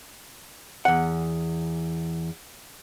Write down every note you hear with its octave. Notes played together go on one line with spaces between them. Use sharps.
E2 F#5